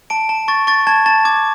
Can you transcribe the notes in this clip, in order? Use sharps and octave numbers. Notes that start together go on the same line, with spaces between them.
A5 D7
A5
C#6 A6
C#6 A6
A5 G#6
A5 A6
D6 G#6